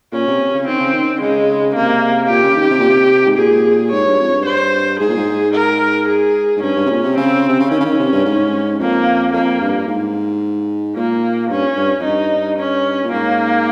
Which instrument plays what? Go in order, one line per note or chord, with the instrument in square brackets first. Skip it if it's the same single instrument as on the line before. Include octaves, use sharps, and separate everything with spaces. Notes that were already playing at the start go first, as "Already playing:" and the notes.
[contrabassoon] A#2 [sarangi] C#4
[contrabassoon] C3
C3
C#3
[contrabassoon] D#3 [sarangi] C4
[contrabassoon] C#3
D#3
[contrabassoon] C#3 [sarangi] G#3
[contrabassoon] C3 [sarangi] A#3
[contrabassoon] A#2 [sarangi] G4
[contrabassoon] C#3
D#3
C3
A#2
C3
G#2
[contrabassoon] A#2 [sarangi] G#4
[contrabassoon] G#2 [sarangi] C#5
[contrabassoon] G2
F2
G2
[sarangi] C5
[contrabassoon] G#2 [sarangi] G#4
[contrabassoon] A#2
G#2
[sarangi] A#4
G#4
[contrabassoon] G#2
[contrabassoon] G2 [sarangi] C#4
[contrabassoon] G2
C3
A#2
C3
[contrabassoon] C#3 [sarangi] C4
[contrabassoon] C3
C#3
[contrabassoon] D#3 [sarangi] C#4
[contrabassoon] C#3
D#3
C3
G2
G#2
[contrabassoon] F2 [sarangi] A#3
[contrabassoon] F2 [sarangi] A#3
[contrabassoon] G2
G#2
[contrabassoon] A#2 [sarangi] A#3
[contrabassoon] G2 [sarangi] C#4
[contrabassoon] G2
F2
[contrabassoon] G2 [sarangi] D#4
[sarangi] C#4
[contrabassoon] A#2
[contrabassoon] G#2 [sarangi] A#3